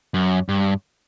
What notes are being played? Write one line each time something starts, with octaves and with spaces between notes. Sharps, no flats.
F#2
G2